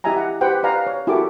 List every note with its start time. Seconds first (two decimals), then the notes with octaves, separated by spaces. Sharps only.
0.04 E4 G4 D#5 E5 G#5 A#5
0.17 F#5
0.41 G4 B4 C5 F#5 G5
0.63 B4 D5 F5 G#5 A#5
0.87 C#5
1.07 E4 F#4 G4 A4 A#4 D6